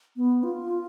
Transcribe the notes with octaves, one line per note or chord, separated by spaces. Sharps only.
B3
F4